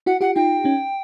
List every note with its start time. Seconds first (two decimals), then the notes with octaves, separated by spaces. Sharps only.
0.06 E4 F#4 F#5
0.21 F4 G4 F#5
0.36 D#4 F4 G5
0.64 C#4 D#4